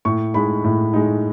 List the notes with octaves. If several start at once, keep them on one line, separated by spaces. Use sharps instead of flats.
A2 C#6
G#3 D#4 B5
A2
G#3 D#4